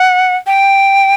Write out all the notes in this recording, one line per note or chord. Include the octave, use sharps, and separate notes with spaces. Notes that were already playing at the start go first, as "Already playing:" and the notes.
Already playing: F#5
G5